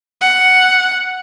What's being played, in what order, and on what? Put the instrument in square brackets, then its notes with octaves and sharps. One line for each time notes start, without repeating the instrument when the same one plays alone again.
[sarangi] F#5